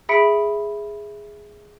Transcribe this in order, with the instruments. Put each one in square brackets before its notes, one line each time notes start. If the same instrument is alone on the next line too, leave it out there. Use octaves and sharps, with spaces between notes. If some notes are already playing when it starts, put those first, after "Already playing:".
[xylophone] G#4 E5 B5 B6 C#7 D7